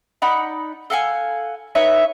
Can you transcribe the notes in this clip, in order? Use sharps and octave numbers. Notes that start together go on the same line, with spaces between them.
D#4 D5 F#5 B5
A4 F5 F#5 G#5
D#4 B4 C#5 E5